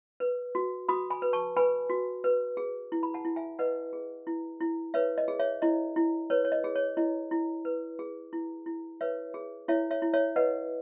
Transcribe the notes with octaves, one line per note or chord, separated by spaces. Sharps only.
B4
F#4
F#4 B5 D#6
G#5 B5
B4
A5 C#6
B4 G#5 B5
F#4
B4
G#4
E4
B5
F#5 A5
E4
E5 G#5
B4 D#5 F#5
G#4
E4
E4
B4 C#5 E5
D#5
G#4
C#5 E5
E4 D#5
E4
B4 C#5
C#5
D#5
G#4
C#5
E4 D#5
E4
B4
G#4
E4
E4
B4 C#5 E5
G#4
E4 C#5 E5
C#5 E5
E4
C#5 E5
B4 D#5 F#5